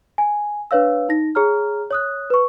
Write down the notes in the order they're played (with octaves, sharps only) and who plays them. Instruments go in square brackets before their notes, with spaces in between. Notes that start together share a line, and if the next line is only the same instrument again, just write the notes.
[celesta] G#5
D4 B4 C#5 F5 E6
D#4 A#6
G#4 C#5 A#5 F6
C#5 D#6 F#6
B4 C#6